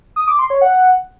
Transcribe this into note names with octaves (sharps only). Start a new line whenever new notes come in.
D#6
D6
C6
C#5
F#5